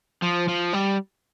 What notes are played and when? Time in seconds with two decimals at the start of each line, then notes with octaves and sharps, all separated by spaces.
0.22 F3
0.49 F3
0.74 G3